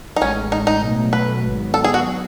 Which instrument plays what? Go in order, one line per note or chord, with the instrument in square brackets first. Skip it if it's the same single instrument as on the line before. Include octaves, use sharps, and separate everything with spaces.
[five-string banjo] D#4
[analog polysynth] A1 A2 G#3 [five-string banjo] C#4
[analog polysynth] A1 A2 G#3 [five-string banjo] D#4
[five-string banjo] D#4
[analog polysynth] B2 F#3 A3
[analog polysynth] B2 F#3 A3 [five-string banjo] B4
[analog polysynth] G#1 G#2 F#3 B3
[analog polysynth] G#1 G#2 F#3 B3 [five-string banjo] A4
[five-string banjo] G#4
F#4
[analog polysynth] F#3 B3